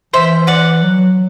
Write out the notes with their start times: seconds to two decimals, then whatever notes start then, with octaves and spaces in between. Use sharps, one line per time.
0.13 E3 C5 E5
0.47 D5 F#5
0.82 F#3